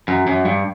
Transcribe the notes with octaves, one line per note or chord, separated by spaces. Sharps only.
F#2
F#2
G2